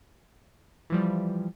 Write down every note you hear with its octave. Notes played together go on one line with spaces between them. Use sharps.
E3 F3 G3